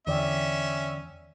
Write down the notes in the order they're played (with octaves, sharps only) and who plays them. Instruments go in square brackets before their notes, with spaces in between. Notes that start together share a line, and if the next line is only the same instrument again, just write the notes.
[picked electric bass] E2 [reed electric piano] D3 D5 G5 [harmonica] C#4 E5